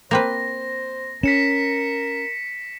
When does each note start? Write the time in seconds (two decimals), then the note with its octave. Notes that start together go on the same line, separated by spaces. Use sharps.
0.11 A#3 C4 B4 C5 A#6
1.23 C#4 A#4 B6 C#7 E7